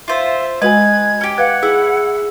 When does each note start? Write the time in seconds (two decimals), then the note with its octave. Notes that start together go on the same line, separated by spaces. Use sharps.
0.08 F4 C5 E5
0.62 G#3 F#4 B4 D#5 G#5 G#6
1.21 C#4 G4
1.38 B4 F5 F#5 F#6 G#6
1.63 E4 G#4 E6